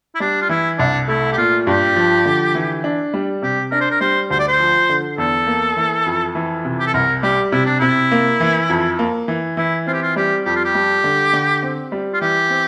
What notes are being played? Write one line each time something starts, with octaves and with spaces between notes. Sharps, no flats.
E4
G3 D4
F4
E3 E4
C2 D4
A3 E4
G4
A#2 F4
G2 G4
F3
D3
E3
D4
G3
C3 G4
D4 A#4
C5
A#4
G3 C5
D2 C5
D5
C5
F3
D3
E2 A4
A#3
E3
F2
E3
C3
G4
A4
C2 A#4
G3 G4
C3 E4
D4
C3 E4
A#3
E3
F2
A#3
E3
E3 E4
C4 F4
G4
F4
G3 G4
F2 G4
F4
G4
G3
D3
D3
C4
G3
F4
E3 G4
C4